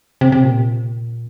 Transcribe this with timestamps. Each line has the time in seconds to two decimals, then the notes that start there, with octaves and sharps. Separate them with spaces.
0.21 C3
0.32 C3
0.44 A#2